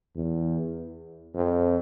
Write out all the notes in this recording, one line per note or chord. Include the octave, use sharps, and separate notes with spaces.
E2
F2